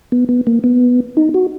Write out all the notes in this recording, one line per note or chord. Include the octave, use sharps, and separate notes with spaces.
B3
B3
A#3
B3
D#4
F#4